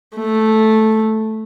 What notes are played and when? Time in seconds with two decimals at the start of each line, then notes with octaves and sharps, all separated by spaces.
0.17 A3